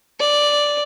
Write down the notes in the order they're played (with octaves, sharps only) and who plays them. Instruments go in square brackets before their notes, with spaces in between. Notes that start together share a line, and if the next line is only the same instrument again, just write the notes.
[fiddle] D5